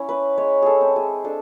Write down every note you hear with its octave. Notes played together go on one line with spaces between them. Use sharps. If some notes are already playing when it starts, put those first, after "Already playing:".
Already playing: C#4 E4
B4
G#3 C#5
G#4 A4
C4
G#4
D4 A4